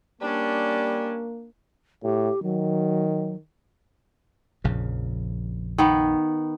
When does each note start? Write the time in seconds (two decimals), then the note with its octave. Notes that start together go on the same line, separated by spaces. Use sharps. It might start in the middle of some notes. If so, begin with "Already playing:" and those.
0.21 G3 A#3 C#4 D4
2.03 A2 G4
2.43 D#3 F#3
4.64 A#1 F2 C#3
5.78 D#3 B3